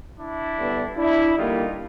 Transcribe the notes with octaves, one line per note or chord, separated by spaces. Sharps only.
D4 E4
D3 G3 B3
D4 E4
D3 G3 A#3 D#4 F4